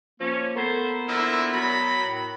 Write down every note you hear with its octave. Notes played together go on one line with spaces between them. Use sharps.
F3 A#3 C#4
A3 B3 A#4 C5
A#2 D3 F3 E4
B2 F#3 B5
A2